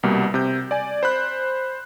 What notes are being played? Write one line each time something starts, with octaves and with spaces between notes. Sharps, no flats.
C2 B2 G3 A#3
C3 G6
D5 G#5
C5 B5 F#6